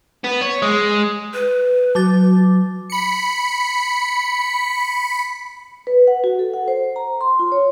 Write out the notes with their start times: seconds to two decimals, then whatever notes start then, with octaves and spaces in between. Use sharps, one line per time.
0.24 B3
0.41 C#5
0.62 G#3
1.34 B4
1.95 F#3 F#4 D6 A6
2.90 B5 C#7
5.87 B4
6.07 F#5
6.24 F#4
6.39 A4
6.54 F#5
6.68 C5
6.96 A#5
7.21 C6
7.39 F4
7.52 C#5